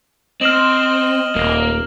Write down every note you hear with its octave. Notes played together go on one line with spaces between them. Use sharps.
C4 D#5 F6 E7 F#7
D#1 A#3